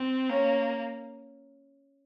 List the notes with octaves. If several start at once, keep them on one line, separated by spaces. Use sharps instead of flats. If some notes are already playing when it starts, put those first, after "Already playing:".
Already playing: C4
A#3 C#4